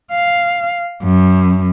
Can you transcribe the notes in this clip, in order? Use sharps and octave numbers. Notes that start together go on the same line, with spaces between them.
F5
F#2